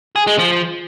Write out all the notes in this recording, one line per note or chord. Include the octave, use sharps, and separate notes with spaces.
G#4
G#3
F3